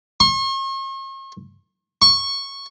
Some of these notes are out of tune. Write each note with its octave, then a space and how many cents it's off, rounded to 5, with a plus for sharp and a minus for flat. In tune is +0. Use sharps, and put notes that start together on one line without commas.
C#6 -45
C#6 -10